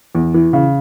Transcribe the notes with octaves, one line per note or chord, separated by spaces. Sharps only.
E2
E3
C#3